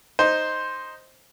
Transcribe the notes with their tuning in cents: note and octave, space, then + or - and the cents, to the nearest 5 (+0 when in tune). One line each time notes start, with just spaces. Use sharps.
D#4 +0 C5 +0